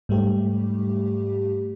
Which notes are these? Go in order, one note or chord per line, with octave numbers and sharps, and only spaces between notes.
G#2 G3 A3 G4